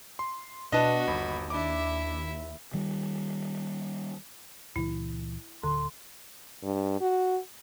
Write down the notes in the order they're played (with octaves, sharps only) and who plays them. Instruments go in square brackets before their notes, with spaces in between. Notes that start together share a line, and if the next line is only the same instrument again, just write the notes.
[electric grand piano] C6
[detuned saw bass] B2 [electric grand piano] D4 B4 [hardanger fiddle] F#4 [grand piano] D#5 A5
[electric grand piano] G1 B5 [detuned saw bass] D#2
[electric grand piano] D4 D6 [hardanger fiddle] E4 E5
[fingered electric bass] D#3 G3
[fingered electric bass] C#2 A#2 E3 [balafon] E4
[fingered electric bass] D1 [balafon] D3 [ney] C6
[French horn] G2
F#4